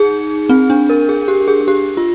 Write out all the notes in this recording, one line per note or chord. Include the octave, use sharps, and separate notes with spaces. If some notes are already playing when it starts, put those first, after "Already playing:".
Already playing: D#4 G#4
C4
D4
A#4
G#4
G4
G#4
G#4
G4
F4